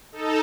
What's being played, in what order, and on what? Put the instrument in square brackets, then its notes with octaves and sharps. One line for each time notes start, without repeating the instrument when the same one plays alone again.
[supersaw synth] D#4 A4